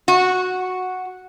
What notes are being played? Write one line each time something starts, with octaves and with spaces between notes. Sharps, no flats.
F#4